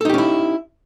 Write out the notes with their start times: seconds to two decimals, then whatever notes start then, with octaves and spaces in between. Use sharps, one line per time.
0.01 A4
0.05 D#4
0.09 G4
0.14 C#4
0.18 E4